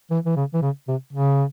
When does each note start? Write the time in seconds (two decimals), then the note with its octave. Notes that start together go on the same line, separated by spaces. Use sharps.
0.11 E3
0.26 E3
0.36 C#3
0.53 E3
0.62 C#3
0.88 C3
1.13 C#3